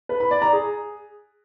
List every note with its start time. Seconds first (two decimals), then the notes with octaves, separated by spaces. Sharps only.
0.09 B4
0.20 B5
0.31 D5
0.42 A#5
0.52 G#4